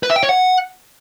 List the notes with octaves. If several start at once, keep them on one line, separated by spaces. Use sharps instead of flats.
B4
E5
G5
C#5
F#5